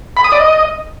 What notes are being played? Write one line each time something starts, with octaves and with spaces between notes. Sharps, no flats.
B5
D#6
D5
D#5